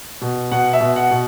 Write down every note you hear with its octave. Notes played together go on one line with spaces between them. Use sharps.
B2
B2 F#5
E5
B2
F#5
B2